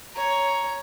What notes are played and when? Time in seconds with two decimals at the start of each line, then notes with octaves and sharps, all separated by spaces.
0.15 C#5 A#5